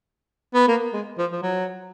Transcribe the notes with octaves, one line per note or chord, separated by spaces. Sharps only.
B3
A#3
G#3
F3
F3
F#3